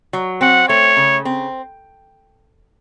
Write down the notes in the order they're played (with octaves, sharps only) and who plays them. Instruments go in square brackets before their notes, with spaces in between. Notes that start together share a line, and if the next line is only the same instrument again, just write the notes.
[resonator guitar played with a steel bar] F#3
[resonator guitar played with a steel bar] C4 [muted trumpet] F#5
[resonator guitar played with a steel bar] A3 [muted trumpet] C#5
[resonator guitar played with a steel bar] C#3
C4